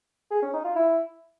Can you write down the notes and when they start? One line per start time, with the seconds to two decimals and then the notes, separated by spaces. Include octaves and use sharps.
0.31 G#4
0.42 C#4
0.53 D#4
0.64 F4
0.76 E4